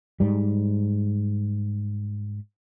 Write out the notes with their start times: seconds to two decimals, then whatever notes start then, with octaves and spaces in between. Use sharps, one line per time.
0.20 G#2 G3